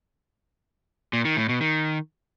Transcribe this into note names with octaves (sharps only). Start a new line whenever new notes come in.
A#2
D#3
A2
B2
D#3